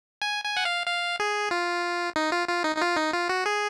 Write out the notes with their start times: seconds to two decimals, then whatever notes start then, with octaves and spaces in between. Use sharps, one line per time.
0.22 G#5
0.44 G#5
0.57 F#5
0.65 F5
0.87 F5
1.20 G#4
1.51 F4
2.16 D#4
2.32 F4
2.48 F4
2.64 D#4
2.76 D#4
2.81 F4
2.97 D#4
3.13 F4
3.29 F#4
3.46 G#4